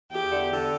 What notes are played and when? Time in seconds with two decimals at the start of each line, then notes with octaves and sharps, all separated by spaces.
0.12 E2 G4
0.32 D3
0.52 D3